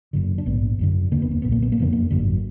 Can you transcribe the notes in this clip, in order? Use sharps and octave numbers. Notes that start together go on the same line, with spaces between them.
F#1 F#2 D3
D4
A#1 G#2 B3
F#1 F#2 D3
F1 D#2 D3 A#3
B3
A#3
B1 A#2 B3
A#3
B3
A#3
F#1 F2 D3 B3
A#3
G#1 F#2 D3